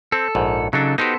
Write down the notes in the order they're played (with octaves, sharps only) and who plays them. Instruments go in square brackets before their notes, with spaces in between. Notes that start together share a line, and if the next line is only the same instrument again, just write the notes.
[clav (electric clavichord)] C4 [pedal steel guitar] A4
[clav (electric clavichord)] A#1 G#2
[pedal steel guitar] C#3 D#4 A4 [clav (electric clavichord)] F#3 D4
[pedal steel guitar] B3 A4 C5 [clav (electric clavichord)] D#4 F#4 G4